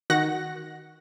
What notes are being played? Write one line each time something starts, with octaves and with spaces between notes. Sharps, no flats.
D#3 F#4 F#5 A#6